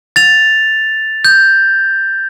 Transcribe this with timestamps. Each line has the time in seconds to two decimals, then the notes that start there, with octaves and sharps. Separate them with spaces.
0.16 A6 F7
1.25 G6